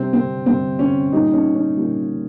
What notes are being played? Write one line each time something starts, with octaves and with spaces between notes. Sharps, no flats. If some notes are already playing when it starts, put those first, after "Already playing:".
Already playing: C3 G3 C4
C4
C3 G3 C4
C#4
A#2 G3 D#4
C#4
C#4
A#2 G3